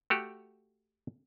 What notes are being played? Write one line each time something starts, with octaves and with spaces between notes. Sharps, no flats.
A3 F#4 G4